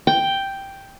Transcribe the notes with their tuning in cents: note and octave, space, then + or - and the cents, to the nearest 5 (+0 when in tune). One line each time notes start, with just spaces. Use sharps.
G5 +0